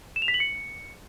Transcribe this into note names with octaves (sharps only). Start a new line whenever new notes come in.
E7
F7
B6
F#7
C#7